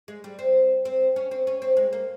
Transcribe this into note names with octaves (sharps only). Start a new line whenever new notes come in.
G#3
G3
C4
C4
C#4
C4
C#4
C4
G#3
A#3